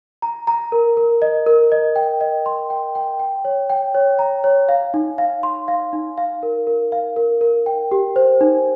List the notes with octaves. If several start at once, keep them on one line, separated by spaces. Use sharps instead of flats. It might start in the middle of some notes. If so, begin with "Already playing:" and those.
A#5
A#5
A#4
A#4
D#5
A#4
D#5
G5
D#5
C6
G5
G5
G5
C#5
G5
C#5
A#5
C#5
F5
D#4
F5
C6
F5
D#4
F5
A#4
A#4
F5
A#4
A#4
G5
G4
C5
D#4